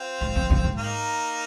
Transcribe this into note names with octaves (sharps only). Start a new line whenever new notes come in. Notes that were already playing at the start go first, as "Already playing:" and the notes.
Already playing: C4 F4
G#2
F2
F2
G#2
A#3 D#4